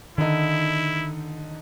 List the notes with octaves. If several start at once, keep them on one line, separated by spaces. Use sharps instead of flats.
D3 D#3 D#4 E4